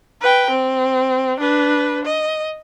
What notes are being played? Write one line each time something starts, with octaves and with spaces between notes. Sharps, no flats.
B4 G5
C4
D4 B4
D#5